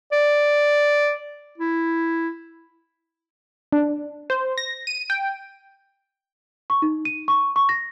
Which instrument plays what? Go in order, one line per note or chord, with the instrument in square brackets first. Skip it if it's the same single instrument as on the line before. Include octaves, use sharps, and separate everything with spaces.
[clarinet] D5
E4
[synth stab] D4
C5
A#6
D#7
G5
[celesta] C#6
D#4
D#7
C#6
C#6
A#6